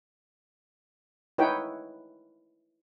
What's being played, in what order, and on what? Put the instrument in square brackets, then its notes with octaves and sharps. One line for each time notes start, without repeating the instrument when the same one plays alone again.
[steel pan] D#4 E4 B4 C#5 F#5 G5